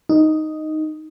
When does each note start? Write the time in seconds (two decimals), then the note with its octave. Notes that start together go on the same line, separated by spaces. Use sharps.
0.09 D#4